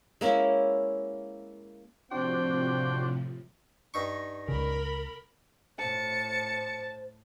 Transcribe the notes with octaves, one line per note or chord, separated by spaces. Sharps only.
G#3 A#3 C#4 E4
A2 C3 F3 C4 D4 F#4 C5 G5
G2 D#4 C#6
C#2 C#3 A#4 B5
A2 C5 A5 C#7